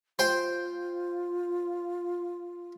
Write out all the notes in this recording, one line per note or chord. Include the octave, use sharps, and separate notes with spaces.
F4 C5 G5